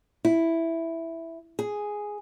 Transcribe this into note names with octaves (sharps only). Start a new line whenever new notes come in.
E4
G#4